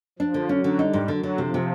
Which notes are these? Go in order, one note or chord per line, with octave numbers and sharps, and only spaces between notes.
F3 D4
D3
F#3 C#4
D3
G3 D#4
G#2
D3 F#3
D3
C3 F3
C3